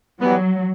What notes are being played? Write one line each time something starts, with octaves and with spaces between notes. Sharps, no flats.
E3 F#3 G3 B3